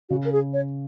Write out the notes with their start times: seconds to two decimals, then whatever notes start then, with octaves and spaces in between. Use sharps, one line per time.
0.09 C#3 F#4
0.25 A#4
0.32 G#4
0.53 C#5